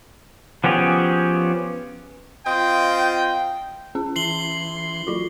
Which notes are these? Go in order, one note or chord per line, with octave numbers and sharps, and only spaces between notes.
F3 B3 C#4 G4 G#4
C4 F4 D#5 G5
C#4 G#4
E3 C6 C7 F#7 G7
F#3 F4 F#4